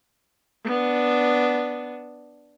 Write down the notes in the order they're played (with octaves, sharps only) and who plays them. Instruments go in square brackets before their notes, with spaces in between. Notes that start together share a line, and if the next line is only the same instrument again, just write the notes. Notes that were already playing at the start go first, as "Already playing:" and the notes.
[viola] B3 D4